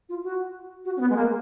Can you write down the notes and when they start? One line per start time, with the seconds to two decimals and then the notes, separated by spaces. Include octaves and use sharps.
0.09 F4
0.24 F#4
0.85 F#4
0.96 C#4
1.00 B3
1.10 G#3
1.16 A#3